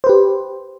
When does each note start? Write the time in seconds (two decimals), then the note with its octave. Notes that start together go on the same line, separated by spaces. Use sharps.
0.04 C5
0.07 B4
0.09 G4